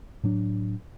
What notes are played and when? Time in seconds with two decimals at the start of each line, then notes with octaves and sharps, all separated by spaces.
0.23 A2 F#3 D4